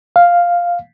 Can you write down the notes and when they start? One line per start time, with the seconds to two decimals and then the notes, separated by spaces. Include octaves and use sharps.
0.16 F5